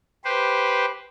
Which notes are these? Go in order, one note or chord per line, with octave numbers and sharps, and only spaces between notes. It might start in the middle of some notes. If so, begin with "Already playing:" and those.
G4 B4 C5